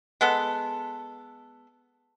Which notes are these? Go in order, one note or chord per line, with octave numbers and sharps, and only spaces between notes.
G#3 B3 A4